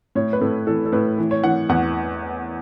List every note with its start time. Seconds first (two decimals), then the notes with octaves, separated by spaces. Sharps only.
0.15 A2 C#5
0.33 B4
0.41 A2 A4
0.67 E3 A4
0.85 A4
0.92 A2 B4
1.18 E3
1.31 C#5
1.44 E3 F#5
1.69 E2 F#5